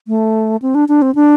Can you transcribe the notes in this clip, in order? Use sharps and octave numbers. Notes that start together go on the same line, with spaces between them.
A3
C4
D4
D4
C4
D4